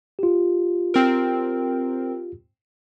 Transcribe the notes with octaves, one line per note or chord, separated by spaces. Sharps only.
F4 G4
C4 A#4